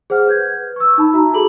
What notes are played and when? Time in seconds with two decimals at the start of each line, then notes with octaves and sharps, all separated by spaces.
0.10 G#4 C5 F#5 F6
0.27 B4 G6 G#6
0.76 C#6 E6
0.98 D#4 A5 B5
1.13 F#4 E5 A#5
1.34 F#4 G#4 A4 B5 F#7